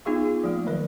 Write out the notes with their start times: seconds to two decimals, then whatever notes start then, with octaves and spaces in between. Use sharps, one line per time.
0.05 B3 D#4 F4 G#4 F5 C#6
0.25 F4
0.44 F3 A3 A#3
0.67 D#3 F#3 A#4 D5